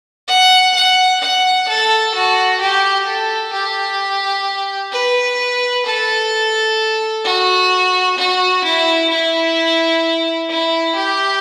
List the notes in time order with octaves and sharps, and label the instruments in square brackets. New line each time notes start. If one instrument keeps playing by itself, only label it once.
[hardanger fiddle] F#5
F#5
F#5
A4
F#4
G4
A4
G4
B4
A4
F#4
F#4
E4
E4
E4
G4